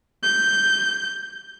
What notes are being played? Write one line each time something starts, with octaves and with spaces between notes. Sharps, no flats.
G6